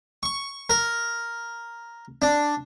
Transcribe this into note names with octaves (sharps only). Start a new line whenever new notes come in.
C#6
A#4
D4